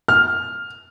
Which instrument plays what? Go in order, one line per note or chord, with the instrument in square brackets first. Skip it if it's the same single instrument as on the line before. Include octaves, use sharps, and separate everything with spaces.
[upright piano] F6